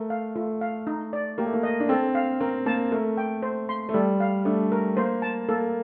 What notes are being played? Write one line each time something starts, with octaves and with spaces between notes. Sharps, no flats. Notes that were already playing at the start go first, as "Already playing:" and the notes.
Already playing: A3 A#4
F5
A3 F4
F5
D#4
D5
A#3 G4
A3
A#3
D#5
D4
C4 A4
F5
C4 A#4
A#3 A5
A3 A#4
G5
C5
C6
A3
G3 A4
F5
A3 D4
A#4
A#3 C5
A5
A#3 A4